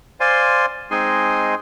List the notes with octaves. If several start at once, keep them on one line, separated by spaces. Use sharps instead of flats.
C5 D5 F5 G#5 C6
G#3 C4 D#4 G#4 G#5 C6